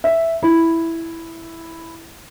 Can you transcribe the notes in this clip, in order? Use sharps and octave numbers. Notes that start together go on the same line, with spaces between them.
E5
E4